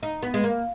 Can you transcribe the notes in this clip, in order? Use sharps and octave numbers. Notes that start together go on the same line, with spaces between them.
D#4
B3
G#3
A#3